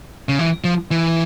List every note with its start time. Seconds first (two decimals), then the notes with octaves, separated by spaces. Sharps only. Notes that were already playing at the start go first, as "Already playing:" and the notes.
0.29 C#3
0.39 E3
0.64 F3
0.91 E3